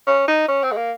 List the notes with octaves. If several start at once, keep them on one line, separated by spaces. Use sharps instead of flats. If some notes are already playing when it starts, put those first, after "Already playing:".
C#4
D#4
C#4
C4
G#3
A#3